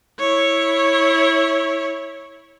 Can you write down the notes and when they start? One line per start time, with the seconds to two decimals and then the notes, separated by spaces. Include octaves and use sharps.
0.19 E4 C#5